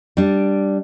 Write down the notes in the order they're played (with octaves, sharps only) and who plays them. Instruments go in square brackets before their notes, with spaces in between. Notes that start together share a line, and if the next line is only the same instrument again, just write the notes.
[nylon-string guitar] G3 D4